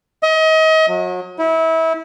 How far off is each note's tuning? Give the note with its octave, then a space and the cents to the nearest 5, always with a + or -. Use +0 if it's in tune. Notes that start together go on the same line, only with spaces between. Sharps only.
D#5 +35
F#3 -35
E4 -25